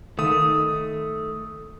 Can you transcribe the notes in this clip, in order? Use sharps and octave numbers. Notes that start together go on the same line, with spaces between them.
D#3 A3 D#6